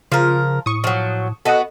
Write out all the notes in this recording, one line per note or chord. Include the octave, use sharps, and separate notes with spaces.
C#3 F3 F4 A#4
A2 C#6 D#6
F3 F#3
B3 F#4 A4 D#5 F#5